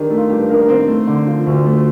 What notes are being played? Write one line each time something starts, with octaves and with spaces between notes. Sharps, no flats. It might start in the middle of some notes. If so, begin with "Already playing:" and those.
Already playing: D#3 D4 G4
A3
F4
G2 G4
A#3 D4 A#4
A#4
D#3 C4 C5
A3
D3
F3
D2
A3